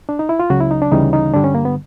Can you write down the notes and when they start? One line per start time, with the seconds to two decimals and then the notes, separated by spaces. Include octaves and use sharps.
0.09 D4
0.19 D#4
0.29 E4
0.40 F4
0.50 C#2 C#3 F#3 F#4
0.61 E4
0.71 D#4
0.82 D4
0.92 D2 C#3 E3 G3 D#4
1.13 D#4
1.34 G2 D3 G3 D4
1.44 C#4
1.55 A#3
1.65 B3